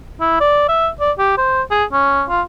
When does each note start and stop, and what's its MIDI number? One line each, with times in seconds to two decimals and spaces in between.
0.21 0.40 64
0.41 0.65 74
0.69 0.89 76
1.00 1.12 74
1.19 1.36 67
1.38 1.62 72
1.71 1.84 68
1.92 2.24 61
2.29 2.42 65